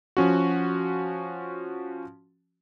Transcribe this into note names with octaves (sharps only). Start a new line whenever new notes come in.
F3 C#4 F#4